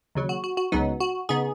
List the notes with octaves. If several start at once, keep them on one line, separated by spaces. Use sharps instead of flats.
D#2 C#3 F#3
F#4
F#4
F#4
C#2 C#3 F#3 B3 D#4
F#4
C#3 B3 D#4 G#4